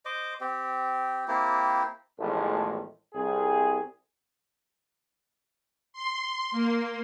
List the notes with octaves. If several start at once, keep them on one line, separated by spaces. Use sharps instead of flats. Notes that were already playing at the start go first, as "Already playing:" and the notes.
C5 D#5 D6
C4 G4
A#3 C4 E4 G4
A1 E2 A2 D#3 F3 G#3
C2 G#4
C6
A#3